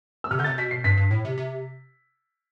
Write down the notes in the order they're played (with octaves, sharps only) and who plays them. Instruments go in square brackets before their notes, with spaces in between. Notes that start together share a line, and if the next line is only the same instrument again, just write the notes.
[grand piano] E6
[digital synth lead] C3 [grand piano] F6
[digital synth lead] D3 [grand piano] G6
[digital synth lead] C3 [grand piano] A6
[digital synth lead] B2 [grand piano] B6
[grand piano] C7
[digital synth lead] G2 [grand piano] B6
[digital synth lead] G2
A2
C3
C3